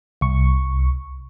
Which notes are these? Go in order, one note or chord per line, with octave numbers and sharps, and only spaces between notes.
C2 C#6